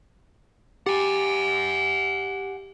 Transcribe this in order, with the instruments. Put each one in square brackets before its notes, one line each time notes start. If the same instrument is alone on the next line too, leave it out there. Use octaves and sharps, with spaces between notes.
[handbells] G4 [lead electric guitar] F#5 G#5